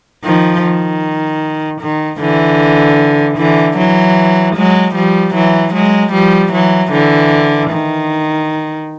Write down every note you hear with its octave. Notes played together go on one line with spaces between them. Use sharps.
D#3 F3
D#3
D#3
D3 E3
D3 E3
E3 F#3
F#3 G#3
F3 G3
E3 F#3
F#3 G#3
F3 G3
E3 F#3
D3 E3
D#3